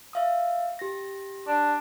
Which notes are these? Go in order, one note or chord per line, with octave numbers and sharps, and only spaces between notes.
E5 F5 D#6
G4 A#6
D4